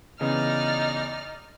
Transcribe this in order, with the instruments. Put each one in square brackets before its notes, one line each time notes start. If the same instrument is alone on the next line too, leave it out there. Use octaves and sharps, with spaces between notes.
[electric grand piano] C#3 E3 B3 [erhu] D#4 [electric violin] D5 F6